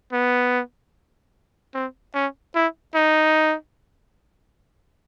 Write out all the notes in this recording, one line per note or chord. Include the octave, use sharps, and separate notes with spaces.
B3
C4
C#4
E4
D#4